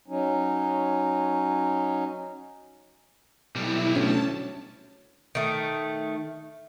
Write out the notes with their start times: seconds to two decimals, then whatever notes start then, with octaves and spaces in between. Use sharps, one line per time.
0.08 F#3 C#4 D#4
3.56 B1 G3 E4
3.95 D2 C#4 A5
5.35 D#3 A3